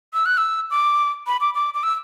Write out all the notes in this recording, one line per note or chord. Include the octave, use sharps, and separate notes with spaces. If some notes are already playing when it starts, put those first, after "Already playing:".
E6
F#6
E6
D6
B5
D6
D6
D6
E6